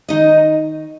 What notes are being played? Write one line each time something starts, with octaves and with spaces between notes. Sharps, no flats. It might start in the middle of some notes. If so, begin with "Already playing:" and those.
D#3 D#4 D#5